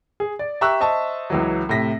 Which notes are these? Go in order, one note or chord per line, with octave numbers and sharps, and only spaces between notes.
G#4
D5
G4 E5 A#5 C#6 E6 F#6
C5 D#5 E5 A5 C#6
C#2 E3 F#3
A2 C3 A#6 B6